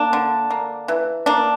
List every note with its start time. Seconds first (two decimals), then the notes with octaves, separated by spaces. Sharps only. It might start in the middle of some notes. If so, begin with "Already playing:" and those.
Already playing: A#3 D4
0.13 D3
0.51 A#3
0.88 E3
1.26 A#3 D4